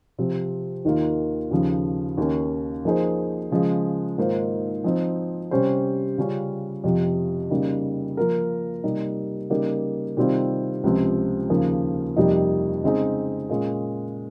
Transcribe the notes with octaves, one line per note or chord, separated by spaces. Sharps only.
C3 F3 C4
D#2 D#3 A#3 F4
D#2 C#3 F3
D#2 D#3 A#3 C#4
F3 A#3 D#4 G#4 C5
C#3 F3 G#3
G#2 D#3 A#3 F4 C5
F3 C4 D#4
C3 G3 C#4 G4 C5
C#3 G3 C#4 F4
F2 C3 F3
C#3 G3 A#3 D#4
F3 A#3 F4 A#4
C3 G3 A#3 D#4
C#3 G3 A#3 D#4 G4
C3 D#3 G3 C4 F4
C#2 C3 F3 C4
D#2 C#3 F3 A#3
F2 C3 G3 A#3 D#4
C#3 G#3 C4 D#4 G#4
A#2 G#3 C#4